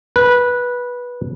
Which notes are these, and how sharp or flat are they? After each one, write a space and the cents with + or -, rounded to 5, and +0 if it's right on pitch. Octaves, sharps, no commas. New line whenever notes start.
B4 -15